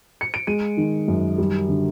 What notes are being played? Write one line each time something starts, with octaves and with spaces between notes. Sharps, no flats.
C#7
D7
G#3 D#7
D#3
F#2
G3
D3